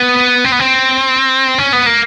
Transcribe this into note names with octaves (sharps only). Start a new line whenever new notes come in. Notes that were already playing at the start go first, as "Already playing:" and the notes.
Already playing: B3
C4
B3
C4
C#4
B3
A#3